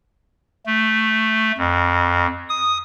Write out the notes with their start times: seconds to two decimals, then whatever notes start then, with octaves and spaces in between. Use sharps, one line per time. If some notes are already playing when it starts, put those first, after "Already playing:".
0.66 A3
1.58 F2
2.49 D#6